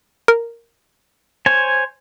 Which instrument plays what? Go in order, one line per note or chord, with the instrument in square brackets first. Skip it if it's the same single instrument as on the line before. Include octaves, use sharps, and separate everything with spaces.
[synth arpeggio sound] A#4
[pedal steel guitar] C5 C#5 G#5